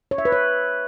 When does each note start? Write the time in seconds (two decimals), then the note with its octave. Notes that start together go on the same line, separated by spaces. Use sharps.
0.11 C#5
0.18 E5
0.25 B4
0.32 C#5